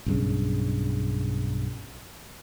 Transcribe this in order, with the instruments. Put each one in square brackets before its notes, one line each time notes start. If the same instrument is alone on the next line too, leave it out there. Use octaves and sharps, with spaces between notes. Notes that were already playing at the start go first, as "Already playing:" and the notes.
[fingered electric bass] B1 G2 C#3